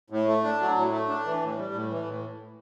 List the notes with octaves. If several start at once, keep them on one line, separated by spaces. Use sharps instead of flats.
A2
A3
D4
F#3
A2
A3
D4
E3
A2
G3
A2
E3
A2